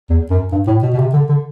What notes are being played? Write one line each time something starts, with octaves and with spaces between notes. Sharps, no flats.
E2
F#2
G2
A2
B2
B2
C3
D3
D3